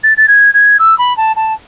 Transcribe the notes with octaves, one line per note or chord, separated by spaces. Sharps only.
A6
A6
G#6
G#6
E6
B5
A5
A5